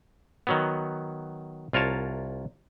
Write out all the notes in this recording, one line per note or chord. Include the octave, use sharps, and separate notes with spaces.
D#3 F#3 B3
C2 F4 A#4 C#5 A5